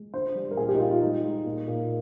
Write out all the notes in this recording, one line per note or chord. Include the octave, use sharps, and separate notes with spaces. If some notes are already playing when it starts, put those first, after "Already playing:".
Already playing: G#3
D3 C5
G3
A#4
A#2 G#4
G4
D#4
G3 F4
F4
G#3 D#4
G#3
A#2
A#2